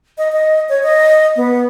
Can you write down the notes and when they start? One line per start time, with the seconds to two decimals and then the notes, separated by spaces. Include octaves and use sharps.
0.18 D#5
0.32 D#5
0.69 C#5
0.83 D#5
1.36 B3